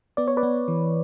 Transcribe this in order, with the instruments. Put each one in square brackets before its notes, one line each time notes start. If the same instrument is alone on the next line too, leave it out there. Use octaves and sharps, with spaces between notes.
[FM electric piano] B3 D5
C#5
B4 D5
B3
E3